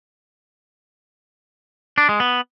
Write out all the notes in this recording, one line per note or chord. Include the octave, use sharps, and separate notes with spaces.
D4
G#3
B3